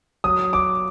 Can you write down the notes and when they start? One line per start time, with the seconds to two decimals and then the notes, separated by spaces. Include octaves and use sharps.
0.24 F#3 D#6
0.53 D6